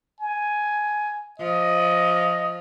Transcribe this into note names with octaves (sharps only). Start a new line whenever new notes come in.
G#5
F3 D#5